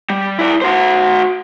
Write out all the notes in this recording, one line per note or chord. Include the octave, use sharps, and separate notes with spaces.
G3
E4 D5
F#4 C5